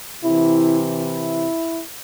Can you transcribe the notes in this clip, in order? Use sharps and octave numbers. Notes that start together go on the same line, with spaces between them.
C3 E3 E4
E4